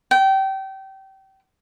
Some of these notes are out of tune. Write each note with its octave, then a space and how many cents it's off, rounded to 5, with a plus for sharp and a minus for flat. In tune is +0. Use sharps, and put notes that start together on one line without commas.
G5 -25